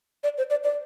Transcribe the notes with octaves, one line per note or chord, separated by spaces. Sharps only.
D5
C5
D5
D5